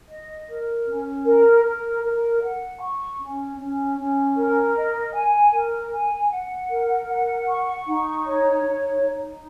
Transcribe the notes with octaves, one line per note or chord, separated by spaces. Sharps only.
D#5
A#4
C#4
A#4
A#4
A#4
F#5
C#6
C#4
C#4
C#4
A#4
D#5
G#5
A#4
G#5
F#5
A#4
F#5
C#6
D#4
C#5
D#4
D#4